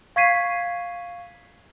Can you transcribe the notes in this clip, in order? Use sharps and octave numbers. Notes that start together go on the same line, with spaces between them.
F5 C#6 G#6 B6 C7 D#7